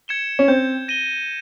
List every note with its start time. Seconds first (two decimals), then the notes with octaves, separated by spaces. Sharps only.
0.08 G#6 C#7 E7 G7
0.39 C#4
0.48 C4 G6
0.88 A#6 D#7 G7